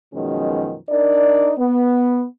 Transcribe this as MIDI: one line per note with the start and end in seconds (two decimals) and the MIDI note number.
0.14 0.76 42
0.14 0.76 47
0.14 0.76 51
0.14 0.76 53
0.14 0.76 56
0.14 0.76 61
0.89 1.52 62
0.89 1.52 63
0.89 1.52 70
0.89 1.52 74
1.58 2.24 59